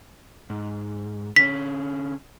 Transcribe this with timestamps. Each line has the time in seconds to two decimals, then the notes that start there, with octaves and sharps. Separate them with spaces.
0.50 G#2
1.36 D3 C#4 B6